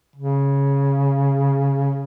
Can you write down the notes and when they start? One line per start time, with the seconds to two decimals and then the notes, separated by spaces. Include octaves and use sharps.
0.16 C#3